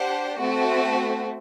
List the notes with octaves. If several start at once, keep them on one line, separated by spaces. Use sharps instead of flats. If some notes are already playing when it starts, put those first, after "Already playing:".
Already playing: D4 G4 C5 F#5
A3 C4 F#4